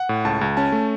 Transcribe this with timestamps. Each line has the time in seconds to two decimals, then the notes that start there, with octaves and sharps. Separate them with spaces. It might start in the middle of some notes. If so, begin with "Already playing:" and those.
Already playing: F#5
0.09 A2
0.25 C#2 A5
0.41 C#2
0.57 C#4 A5
0.72 A3